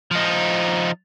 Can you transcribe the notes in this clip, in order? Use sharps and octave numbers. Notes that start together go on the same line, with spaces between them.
F3 D#4